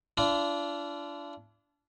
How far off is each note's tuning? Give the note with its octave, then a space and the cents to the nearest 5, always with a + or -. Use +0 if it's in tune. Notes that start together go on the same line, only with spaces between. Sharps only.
D4 -20 F4 -45